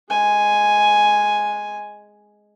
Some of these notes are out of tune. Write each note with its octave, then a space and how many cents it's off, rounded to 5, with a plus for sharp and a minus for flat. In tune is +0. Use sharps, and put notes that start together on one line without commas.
G#3 +0 G#5 +0